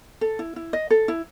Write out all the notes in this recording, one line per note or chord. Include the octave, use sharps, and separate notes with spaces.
A4
E4
E4
D#5
A4
E4